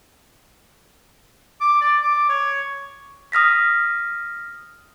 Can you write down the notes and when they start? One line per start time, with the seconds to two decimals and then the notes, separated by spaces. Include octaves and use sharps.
1.61 D6
1.81 D5
2.03 D6
2.29 C#5
3.32 D#6 F6 A#6 B6